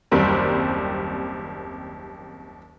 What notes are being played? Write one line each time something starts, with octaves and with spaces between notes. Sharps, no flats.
F#1 D#2 G3 C4 A#4